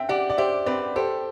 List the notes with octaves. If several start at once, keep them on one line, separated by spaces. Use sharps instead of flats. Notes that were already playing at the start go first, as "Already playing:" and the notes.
Already playing: C4 E5 G5
G4 D5 F#5
D5
G4 C5 E5
C4 B4 D5
G4 A4 C5